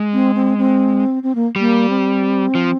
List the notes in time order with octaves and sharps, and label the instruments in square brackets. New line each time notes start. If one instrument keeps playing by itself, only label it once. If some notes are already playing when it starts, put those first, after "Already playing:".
Already playing: [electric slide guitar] G#3
[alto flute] C4
C4
C4
C4
A#3
[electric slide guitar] G3 [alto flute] A#3
[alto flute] C4
[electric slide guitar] F3